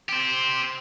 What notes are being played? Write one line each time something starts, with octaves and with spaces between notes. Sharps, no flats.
G4 C5